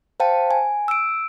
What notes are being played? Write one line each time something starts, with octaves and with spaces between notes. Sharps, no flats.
C5 F5 G5 A5
G#5
E6 D7